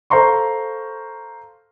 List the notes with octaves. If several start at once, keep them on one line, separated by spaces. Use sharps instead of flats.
A4 C5 F5 A#5 C6 C#6